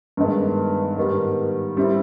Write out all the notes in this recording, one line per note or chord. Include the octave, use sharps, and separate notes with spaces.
G2 D#3 G#3 B3
G#2 D#3 G3 B3
G3 C4 E4